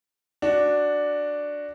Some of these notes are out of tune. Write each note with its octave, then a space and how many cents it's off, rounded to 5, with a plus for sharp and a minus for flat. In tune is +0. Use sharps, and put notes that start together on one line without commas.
D4 +0 F#4 +0